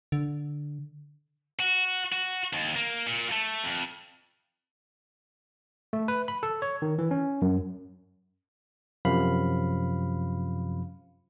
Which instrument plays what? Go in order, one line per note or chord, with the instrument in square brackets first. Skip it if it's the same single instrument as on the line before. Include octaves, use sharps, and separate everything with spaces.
[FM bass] D3
[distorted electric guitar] F#4
F#4
D#2
A#3
A#2
A3
F2
[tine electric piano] A3
B4
B5
A4
C#5
D#3
E3
C#4
F#2
F#2 C3 F3 F5 B5